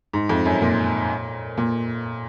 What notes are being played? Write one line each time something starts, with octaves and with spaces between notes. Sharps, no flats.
G#2
F2
F#2
A#2
A#2